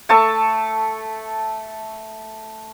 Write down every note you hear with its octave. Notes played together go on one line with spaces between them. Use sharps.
A3 A5 C#6 E6